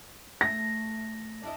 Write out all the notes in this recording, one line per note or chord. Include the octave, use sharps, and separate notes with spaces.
A3 A#6
D4 E4 D#5